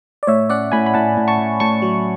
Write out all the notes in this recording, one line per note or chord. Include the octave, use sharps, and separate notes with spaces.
D5
A2 C#5 E5
C#4 D5 F#5
A2 G#5 B5
B5
A2 F#5 A5
A2
A5 C#6
A2
A2 A5 C#6
F#3